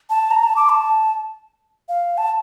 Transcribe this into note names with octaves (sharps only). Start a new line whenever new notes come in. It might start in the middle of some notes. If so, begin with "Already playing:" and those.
A5
A#5
A5
D6
A5
F5
A5